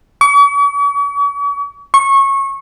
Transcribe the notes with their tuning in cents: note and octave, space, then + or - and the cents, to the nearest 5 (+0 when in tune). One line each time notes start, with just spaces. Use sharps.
C#6 +45
C#6 -20